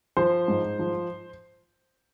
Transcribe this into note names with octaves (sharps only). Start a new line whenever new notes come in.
F3 C5
G#2
F3